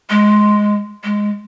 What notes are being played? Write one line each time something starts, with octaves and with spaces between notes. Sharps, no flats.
G#3
G#3